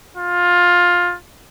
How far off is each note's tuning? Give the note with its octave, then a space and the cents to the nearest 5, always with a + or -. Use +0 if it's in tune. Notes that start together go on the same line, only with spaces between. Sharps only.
F4 +15